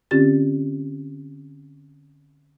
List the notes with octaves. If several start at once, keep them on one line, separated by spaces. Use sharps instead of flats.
D3 C4 C#4 F4 G4 A6